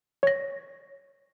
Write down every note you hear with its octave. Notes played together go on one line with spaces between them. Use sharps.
C#5 A#6